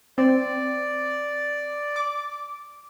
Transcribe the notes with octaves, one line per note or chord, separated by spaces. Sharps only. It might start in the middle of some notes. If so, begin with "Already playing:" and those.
C4 D5
D6